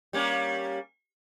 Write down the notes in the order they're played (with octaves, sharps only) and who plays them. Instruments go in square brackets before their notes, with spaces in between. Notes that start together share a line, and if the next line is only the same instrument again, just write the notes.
[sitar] G3 A#3 C#4